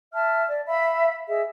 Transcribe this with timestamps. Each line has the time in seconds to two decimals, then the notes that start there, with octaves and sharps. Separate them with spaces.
0.12 E5 A5 F6
0.47 D5
0.67 E5 F5 B5
1.27 G#4 D#5 E5